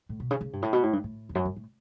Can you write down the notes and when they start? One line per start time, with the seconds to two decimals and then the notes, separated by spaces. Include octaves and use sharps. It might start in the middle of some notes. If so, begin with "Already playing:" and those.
0.09 A2
0.20 B2
0.31 C#3
0.41 C#3
0.53 G2
0.62 A2
0.73 B2
0.83 A2
0.93 G2
1.04 A2
1.29 E2
1.35 F#2
1.45 G2
1.56 A2